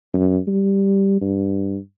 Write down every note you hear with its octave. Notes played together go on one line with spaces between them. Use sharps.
F#2
G3
G2